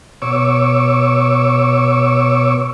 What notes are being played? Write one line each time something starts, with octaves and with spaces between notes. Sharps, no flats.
B2 C#5 C#6 D6 E6